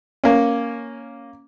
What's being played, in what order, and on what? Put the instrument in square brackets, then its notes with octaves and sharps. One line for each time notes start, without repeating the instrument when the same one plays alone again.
[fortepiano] A#3 C#4